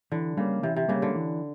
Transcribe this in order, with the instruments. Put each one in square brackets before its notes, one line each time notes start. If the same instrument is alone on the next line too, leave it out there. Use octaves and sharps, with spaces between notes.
[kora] D3 [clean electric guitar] E3
[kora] C#3 [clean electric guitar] G3 A#3
[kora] C3 [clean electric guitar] E3
[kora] C3
[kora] C#3 [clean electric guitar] G3 A#3
[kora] D3
[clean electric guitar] E3